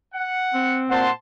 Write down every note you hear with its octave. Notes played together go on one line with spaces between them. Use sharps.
F#5
C4
A#2 C5 F#5 A5 C6